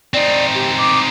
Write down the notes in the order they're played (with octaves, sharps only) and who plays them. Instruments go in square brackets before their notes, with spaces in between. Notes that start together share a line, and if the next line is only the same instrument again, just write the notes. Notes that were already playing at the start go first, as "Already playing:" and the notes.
[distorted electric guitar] C4 D#4 [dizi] D5
[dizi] G4
D6